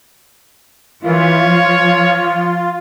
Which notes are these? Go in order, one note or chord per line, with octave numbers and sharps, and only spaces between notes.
E3 F4 C#5
F3